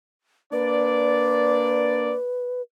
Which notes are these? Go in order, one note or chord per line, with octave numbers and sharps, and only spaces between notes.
A#3 D4 B4 D5